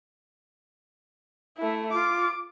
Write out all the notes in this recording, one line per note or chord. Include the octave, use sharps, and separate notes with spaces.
A3 E4
F4 D6